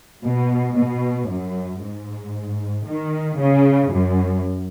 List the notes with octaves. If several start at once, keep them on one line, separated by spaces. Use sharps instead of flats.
B2
B2
F#2
G#2
D#3
C#3
F#2